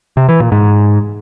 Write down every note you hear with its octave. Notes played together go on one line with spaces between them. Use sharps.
C3
E3
A#2
G#2